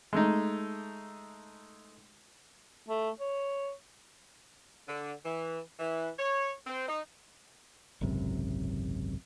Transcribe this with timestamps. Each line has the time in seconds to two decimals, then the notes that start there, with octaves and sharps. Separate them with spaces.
0.13 G#3 A3 D#4
2.89 A3
3.20 C#5
4.88 D3
5.25 E3
5.79 E3
6.18 C#5
6.67 C4
6.89 D#4
8.01 G#1 C#2 F#2 C3